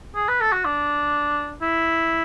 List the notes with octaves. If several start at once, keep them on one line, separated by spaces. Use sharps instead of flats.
G#4
B4
A4
F#4
D4
E4